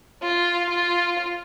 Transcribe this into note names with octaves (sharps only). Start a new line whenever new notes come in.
F4
F4